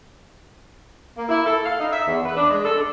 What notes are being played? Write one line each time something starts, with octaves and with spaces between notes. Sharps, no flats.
A#3
E4
A4
F5
D#4
E5
E2
B4
D4
G#3
A4
D4